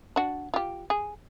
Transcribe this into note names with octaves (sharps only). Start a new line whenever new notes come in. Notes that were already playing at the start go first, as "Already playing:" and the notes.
D4 F#4
F4 G4
G#4